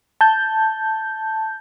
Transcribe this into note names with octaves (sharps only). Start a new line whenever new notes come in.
A5 G6